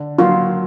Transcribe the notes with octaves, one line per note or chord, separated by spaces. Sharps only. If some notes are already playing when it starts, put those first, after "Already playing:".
Already playing: D3
F#3 A#3 F4